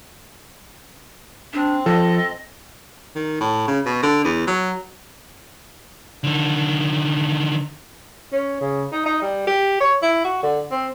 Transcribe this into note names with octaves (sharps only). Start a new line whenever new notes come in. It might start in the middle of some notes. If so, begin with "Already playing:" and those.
C4 D4
F3 A4 D#5
D#3
A2
C#3
B2
D3
E2
F#3
D3 D#3
C#4
C#3
D#4
D#4
G3
G4
C#5
E4
F#4
D3
C4